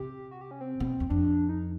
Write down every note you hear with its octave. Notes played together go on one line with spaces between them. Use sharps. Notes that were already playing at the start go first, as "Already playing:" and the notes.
Already playing: C3 G4
F#4
G4
C#4
C4
B2
E2
F2 D4
D#4